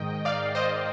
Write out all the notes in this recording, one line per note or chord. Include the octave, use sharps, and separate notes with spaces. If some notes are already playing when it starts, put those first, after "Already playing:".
Already playing: G#2 D#3 D#5 G5
D5 F5
C5 D#5